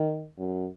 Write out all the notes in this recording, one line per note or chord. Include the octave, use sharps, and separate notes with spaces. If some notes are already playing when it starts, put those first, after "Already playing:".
Already playing: D#3
F#2